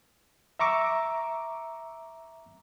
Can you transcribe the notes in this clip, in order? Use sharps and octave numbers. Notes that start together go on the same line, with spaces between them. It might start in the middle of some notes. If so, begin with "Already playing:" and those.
E5 A#5 C#6 D6 E6